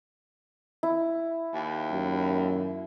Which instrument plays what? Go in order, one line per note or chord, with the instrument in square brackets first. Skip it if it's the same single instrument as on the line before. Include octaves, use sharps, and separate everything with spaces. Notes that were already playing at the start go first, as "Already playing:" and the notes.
[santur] E4
[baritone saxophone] D#2
[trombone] F#2